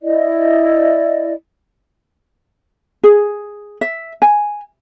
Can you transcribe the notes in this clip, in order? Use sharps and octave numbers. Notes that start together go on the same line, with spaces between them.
E4 D5 D#5
G#4
E5
G#5